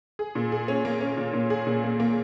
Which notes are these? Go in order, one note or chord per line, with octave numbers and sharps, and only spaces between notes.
G#4
A#2
G#4
C#4
A#3
C#4
A#2
A#2
G#4
A#2
A#3
A#3